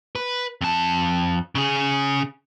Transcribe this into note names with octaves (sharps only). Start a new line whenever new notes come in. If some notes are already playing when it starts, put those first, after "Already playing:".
B4
F2 A5
C#3 G#4